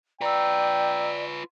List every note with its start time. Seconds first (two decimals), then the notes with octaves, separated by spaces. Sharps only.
0.21 F4 B4 D5 G5 A#5 E6